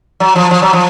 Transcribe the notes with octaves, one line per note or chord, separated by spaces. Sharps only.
F#3
F3
F3
F#3
F3